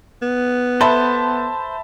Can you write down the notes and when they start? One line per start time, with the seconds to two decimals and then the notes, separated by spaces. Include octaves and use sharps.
0.22 B3
0.81 A4 B4 C5 E5 A5 B5